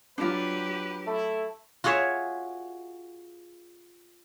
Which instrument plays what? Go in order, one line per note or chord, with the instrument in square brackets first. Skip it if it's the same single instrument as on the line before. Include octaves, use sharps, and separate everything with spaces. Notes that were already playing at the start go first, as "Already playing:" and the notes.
[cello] F#3 G4 [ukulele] D4 F4 [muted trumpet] B4
[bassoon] A3 [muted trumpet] E4
[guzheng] F4 F#4 G#4 C#5 E5